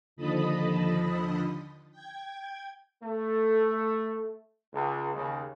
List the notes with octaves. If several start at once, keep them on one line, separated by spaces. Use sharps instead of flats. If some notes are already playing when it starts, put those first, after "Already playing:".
D#2 D3 F3 D#5 A5 B5
G5 G#6
A3
C#2
D#2 C#3